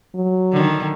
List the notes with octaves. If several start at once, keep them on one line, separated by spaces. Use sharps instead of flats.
F#3
D3 D#3